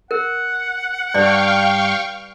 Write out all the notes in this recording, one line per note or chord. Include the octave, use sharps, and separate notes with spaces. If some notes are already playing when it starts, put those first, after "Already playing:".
A#4 F#5
G2 D5 F5 G5 C#6